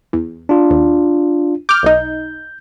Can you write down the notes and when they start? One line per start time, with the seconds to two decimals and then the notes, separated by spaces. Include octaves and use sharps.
0.13 E2
0.49 D4 F4
0.70 D#2
1.69 D6 F6 G6
1.83 B1 D#4